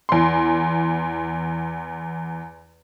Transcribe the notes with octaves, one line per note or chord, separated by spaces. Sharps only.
E2 C6